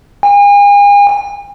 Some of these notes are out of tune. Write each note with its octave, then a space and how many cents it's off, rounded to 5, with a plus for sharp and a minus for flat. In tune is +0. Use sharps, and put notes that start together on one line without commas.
G#5 -40